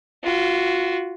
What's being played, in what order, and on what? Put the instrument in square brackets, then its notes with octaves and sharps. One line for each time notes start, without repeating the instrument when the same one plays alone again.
[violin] F4 F#4